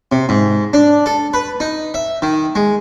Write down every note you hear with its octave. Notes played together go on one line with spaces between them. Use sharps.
C3
G#2
D4
A4
B4
D#4
E5
D#3
G#3